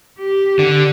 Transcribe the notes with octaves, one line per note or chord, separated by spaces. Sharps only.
G4
D3